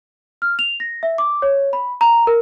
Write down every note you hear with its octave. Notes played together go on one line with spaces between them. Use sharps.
F6
F7
A#6
E5
D6
C#5
B5
A#5
A#4